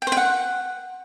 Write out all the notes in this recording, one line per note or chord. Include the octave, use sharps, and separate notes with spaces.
G5
C5
G5
F#5